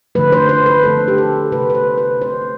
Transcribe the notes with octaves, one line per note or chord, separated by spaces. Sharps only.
D3 F3 A3 B4
C5
C5
B4
D3 F3 A3 A4
G4
A4
C3 F3 A3 B4
B4
C5
B4
C3 F3 A3 C5